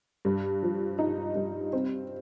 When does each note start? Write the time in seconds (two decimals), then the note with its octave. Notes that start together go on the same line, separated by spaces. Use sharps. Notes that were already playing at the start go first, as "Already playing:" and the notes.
0.25 G2
0.63 F3
0.99 D#4
1.36 G2
1.73 C4